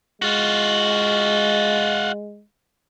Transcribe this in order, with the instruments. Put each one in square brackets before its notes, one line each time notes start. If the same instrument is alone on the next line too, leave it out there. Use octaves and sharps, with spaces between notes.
[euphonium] G#3 [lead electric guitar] F4 F#4